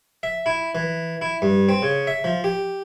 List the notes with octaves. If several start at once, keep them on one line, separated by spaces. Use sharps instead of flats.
E5
E4
E3
E4
G2
C4
C#3
E5
F3
G4